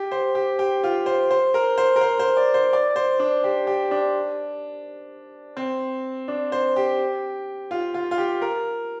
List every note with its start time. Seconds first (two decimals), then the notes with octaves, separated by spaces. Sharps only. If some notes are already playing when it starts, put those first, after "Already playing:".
Already playing: G4
0.11 C5
0.35 G4
0.59 G4
0.84 F4
1.06 C5
1.31 C5
1.54 A#4
1.78 C5
1.96 A#4
2.01 C5
2.19 C5
2.37 D5
2.54 C5
2.73 D5
2.96 C5
3.19 D4
3.44 G4
3.67 G4
3.91 D4
5.57 C4
6.28 D4
6.52 C5
6.76 G4
7.71 F4
7.94 F4
8.11 F4
8.18 G4
8.42 A#4